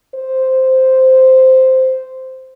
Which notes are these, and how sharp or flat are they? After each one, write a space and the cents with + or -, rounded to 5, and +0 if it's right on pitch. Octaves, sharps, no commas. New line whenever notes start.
C5 -5